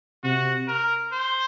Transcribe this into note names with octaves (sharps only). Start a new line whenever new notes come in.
C3 F#4
A#4
C5